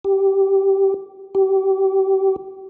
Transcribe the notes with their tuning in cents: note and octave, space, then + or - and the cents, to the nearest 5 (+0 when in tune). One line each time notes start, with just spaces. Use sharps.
G4 -10
G4 -30